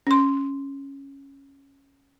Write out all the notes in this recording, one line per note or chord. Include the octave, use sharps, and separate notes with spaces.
C#4 C6